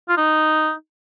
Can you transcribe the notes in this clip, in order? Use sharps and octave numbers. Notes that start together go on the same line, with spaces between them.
F4
D#4